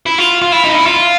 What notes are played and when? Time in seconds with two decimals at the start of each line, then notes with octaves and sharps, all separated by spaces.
0.06 E4
0.18 F4
0.42 F4
0.52 E4
0.64 D#4
0.75 E4
0.86 F4